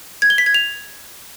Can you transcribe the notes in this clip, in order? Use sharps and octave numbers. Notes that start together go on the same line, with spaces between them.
G#6
G7
B6
G#6
F7